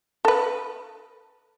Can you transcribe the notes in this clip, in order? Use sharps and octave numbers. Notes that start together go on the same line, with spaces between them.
A4 B4